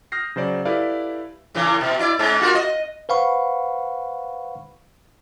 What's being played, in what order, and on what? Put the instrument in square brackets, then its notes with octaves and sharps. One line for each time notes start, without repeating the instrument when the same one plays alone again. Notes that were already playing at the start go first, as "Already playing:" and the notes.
[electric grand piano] D#6 F6 G6 A#6 C7
C#3 F#3 C5 D5
E4 G4 A4 B4 D5 F5
[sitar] A2 C#3 E3
B2
E4 D5
G#2 G#3 C#4
F4 F#4 A#4
D#5
[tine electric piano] B4 C5 F5 F#5 B5 C#6